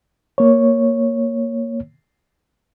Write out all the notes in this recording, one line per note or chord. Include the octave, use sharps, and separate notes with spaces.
A#3 C#5